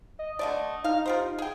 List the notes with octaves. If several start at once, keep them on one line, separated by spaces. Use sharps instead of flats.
D#5
D3 A3 D5
D#4 F5
F4 G4 C5
G#4 G5